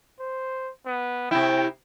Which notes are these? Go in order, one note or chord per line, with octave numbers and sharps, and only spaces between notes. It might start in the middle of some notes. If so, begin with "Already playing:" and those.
C5
B3
C3 E4 G5